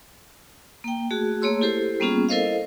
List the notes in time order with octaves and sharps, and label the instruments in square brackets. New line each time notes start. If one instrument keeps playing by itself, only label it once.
[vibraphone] A#3 G5
A3 F#4 G#4
A3 A#3 G#4 C#5 C6 E6
E4 G4 A4 C5
G3 A#3 B3 C#4 F4 G#4
E4 A4 A#4 C5 D#5 F5